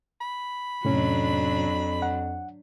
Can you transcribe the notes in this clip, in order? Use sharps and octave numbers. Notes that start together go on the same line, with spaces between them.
B5
F2 A2 C3 F#3 C#4 D4
F#5